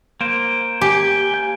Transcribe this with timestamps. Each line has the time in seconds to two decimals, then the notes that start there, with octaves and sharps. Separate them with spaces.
0.21 A#3 C5 D7
0.81 G4 G#5 G6 D7